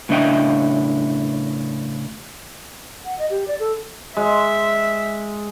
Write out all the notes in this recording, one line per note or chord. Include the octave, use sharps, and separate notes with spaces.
A2 C#3 D4 D#5 E5 G5
F#5
D#5
G4
D5
A4
G#3 E5